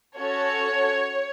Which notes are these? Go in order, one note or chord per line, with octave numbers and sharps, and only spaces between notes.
C#4 F#4 A4 C#5